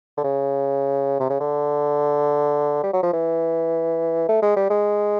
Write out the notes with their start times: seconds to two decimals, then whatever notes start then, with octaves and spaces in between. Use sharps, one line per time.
0.17 D3
0.24 C#3
1.20 C3
1.30 C#3
1.40 D3
2.83 G3
2.93 F#3
3.03 F3
3.13 E3
4.28 A3
4.42 G#3
4.56 G3
4.70 G#3